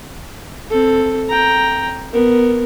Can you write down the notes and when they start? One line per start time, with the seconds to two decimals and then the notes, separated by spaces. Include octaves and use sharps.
0.70 C4 A4
1.29 G5 A#5
2.13 B3 A#4